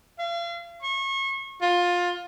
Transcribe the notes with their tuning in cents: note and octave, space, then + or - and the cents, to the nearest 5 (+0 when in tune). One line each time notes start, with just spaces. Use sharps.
F5 -35
C#6 -30
F4 +20